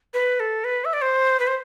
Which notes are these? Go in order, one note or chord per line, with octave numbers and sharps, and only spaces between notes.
B4
A4
B4
E5
D5
C5
B4
C5